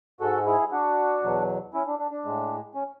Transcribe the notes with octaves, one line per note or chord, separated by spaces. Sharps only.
G#2 G#3 F#4 A4
E4 G#4
D4 F#4
E2 B2 F#3
C#4 E4
D4
D4
D4
A2 G#3
C#4